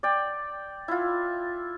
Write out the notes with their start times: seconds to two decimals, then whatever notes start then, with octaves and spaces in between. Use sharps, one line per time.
0.03 D5 G5
0.88 E4 F4